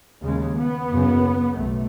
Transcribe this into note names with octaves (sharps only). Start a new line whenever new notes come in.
D#2 C#3 G#3
B3
F#1 F#2 C#3
B1 A3